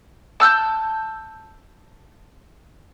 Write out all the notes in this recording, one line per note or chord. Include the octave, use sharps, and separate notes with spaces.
A5 E6 F#6 G6